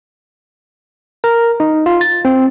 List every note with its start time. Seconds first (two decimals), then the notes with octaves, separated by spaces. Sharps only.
1.24 A#4
1.60 D#4
1.86 F4
2.01 A6
2.25 C4